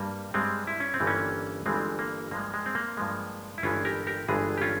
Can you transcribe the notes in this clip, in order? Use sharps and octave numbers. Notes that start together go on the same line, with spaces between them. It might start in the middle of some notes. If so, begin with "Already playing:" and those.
Already playing: G2 G3 A#3
G2 G3 G#3 C4
E4
C#4
C4
G1 G2 E3 G3
A#3 C#4
G1 G2 E3 G3 G#3 C4
A#3
G2 F3 G#3 A#3
G#3
C4
A#3
G2 F3 G#3
E4
G1 G2 E3 G#3 C#4 F4
G4 A#4
G4 A#4
G1 G2 E3 G#3 F4 G#4
G4
C#4 F4